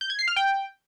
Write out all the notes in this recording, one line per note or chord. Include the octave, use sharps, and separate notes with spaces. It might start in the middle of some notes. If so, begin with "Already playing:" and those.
G6
G#6
C7
F6
G5